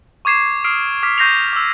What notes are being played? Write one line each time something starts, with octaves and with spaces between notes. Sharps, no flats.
C#6 D6 G#6 C7 E7
D#6 F6 C7 D7
D6 F6 B6
C#6 G6 A#6 C7 F7
D6 E6